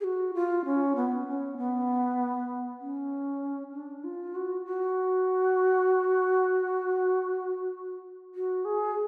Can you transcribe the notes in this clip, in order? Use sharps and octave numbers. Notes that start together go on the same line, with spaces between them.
G#4
F#4
F4
C#4
B3
C#4
B3
C#4
D4
F4
F#4
F#4
F#4
G#4